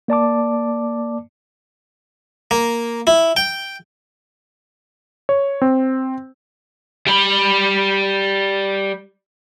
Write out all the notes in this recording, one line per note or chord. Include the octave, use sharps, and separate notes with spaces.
A#3 D5 A5 D6
A#3
E4
G5
C#5
C4
G3 B5